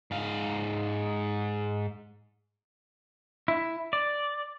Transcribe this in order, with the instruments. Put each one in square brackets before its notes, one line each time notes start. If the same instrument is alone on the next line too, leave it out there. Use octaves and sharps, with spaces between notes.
[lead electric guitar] G#2 F5
[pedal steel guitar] E4
D5